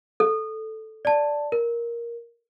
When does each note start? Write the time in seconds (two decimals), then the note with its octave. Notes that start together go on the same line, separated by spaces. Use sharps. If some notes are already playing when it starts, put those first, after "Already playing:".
0.20 A4
1.05 D5 A5
1.52 A#4